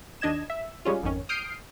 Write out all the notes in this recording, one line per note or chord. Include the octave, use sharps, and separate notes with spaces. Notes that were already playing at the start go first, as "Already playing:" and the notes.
D#2 D4 D#5 G#6 E7
E5
G3 G#3 C#4 F4
G#1 F2 D#3 C#4
D#6 F6 G6 C7 D7